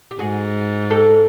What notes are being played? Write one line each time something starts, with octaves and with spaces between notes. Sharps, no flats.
G4
G#2 F#4 G#4
G4 A4